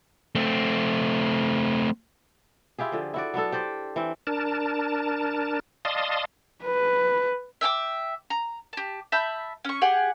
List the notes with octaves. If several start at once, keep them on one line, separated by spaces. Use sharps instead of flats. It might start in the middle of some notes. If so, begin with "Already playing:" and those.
A3 C4
E4 F4 G4 G#4
D3 F3
E4 F#4 D5
F#3 B3 D4 A4
G4 C5 D5
E3 C4
D4 A#4 A5
D5 D#5 F5 A5 C6 D#6
B4
E5 G5 G#5 D6
A#5
G4 A5
E5 A5 B5 G6
C#4 C#6
G4 G#4 F#5